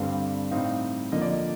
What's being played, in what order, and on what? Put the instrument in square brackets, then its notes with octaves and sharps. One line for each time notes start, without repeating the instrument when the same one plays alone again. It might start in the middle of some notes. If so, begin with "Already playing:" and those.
Already playing: [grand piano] G2 D3 G3 C4 F5
A2 G3 C4 D#4 F5
D3 F3 A#3 D#5
D5
D#5